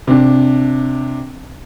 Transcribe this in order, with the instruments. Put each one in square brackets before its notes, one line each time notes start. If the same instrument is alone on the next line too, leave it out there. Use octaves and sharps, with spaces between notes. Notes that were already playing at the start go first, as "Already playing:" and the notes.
[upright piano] C3 D4